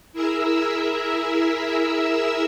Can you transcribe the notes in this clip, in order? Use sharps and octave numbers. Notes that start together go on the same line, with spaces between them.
E4 G#4 A#4 E5 E6